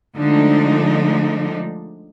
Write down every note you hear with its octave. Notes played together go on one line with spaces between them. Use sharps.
D3 F3 G#3 A3 D4 D#4